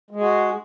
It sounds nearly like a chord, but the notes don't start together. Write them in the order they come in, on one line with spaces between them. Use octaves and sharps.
G#3 G#4 F#4